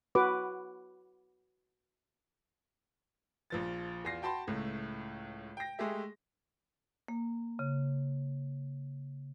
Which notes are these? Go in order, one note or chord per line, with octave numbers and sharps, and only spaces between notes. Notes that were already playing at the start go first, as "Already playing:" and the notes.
F#4 B4 D6
A#1 F3 A6
E2 F4 A#6 C7
F#4 G5 A5 B5 C6
C#2 A2 A3
G5 A#6
G#3 A3 G4 G#4 E5
A#3
C#3